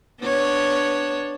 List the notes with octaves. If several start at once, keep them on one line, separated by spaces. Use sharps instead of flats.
B3 D4 C#5